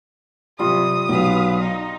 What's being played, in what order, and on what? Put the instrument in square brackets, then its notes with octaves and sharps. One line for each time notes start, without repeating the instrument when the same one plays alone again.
[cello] C3 F#3 [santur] G3 F4 [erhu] D#6
[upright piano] B1 [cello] B4 F5
[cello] D#4